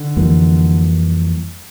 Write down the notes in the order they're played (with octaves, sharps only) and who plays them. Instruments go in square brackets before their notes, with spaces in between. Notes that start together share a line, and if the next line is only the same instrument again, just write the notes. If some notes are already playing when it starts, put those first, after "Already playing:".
Already playing: [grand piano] D3
[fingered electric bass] F2 E3 G3 A#3